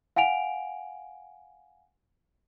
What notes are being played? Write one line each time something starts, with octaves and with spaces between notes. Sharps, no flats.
F5 F#5 G#5 D7 F7